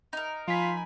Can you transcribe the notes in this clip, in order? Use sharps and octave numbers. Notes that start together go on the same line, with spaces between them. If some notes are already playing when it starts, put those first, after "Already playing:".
D#4 A#4
F3 F4 G#5 B5 B6